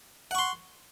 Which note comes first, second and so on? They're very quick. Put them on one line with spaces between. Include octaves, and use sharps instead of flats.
F#5 C#6 C6